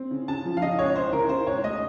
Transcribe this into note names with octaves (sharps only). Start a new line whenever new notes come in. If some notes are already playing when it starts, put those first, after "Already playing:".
Already playing: C4
C#3
C#3 A5
F3
F5
C#3 D#5
C#2 C#5
C#3 C5
C#3 A#4
C#3 C5
C#2 C#5
A3 D#5